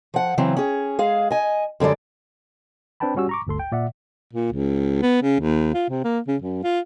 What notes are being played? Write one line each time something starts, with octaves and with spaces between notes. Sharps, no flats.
F3 F#5
C#3 E3 F#3 C4
C#4 G#4
G#3 G#4 F5
D#5 G#5
F#2 D3 G3 G#3 D5
C4 D4 B4 G5 A5 B5
G3 C#4 F#4 G4 E6
A#5 C#6 D6
G1 D2 A4 C6
G5
A#2 D5 E5 F#5
A#2
C#2
B3
C#3
D#2
F4
C3
A#3
C#3
F#2
F4